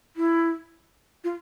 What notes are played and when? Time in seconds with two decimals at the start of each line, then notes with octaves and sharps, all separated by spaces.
0.16 E4
1.24 F4